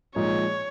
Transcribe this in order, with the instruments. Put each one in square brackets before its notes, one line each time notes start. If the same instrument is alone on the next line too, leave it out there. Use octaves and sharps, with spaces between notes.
[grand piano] A#2 F3 G#3 D#4 G#4 [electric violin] C#5